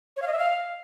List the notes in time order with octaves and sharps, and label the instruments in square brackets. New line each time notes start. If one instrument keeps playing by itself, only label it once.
[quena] C#5
F5
D#5
E5
F5